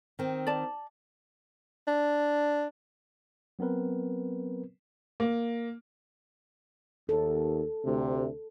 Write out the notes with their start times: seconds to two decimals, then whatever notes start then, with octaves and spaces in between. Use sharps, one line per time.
0.19 D#3 C4
0.47 D5 A5
1.88 D4
3.59 F#3 B3 C4 A#4 B4
5.20 A#3
7.09 D#2 A4
7.84 D2 C3